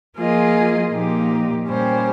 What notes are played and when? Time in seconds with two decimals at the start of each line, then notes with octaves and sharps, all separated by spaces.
0.18 F3 A#3 F4 G#4 D#5
0.93 A#2 F3 A#3 D#4 G4
1.68 A#2 G3 C#4 G4 C5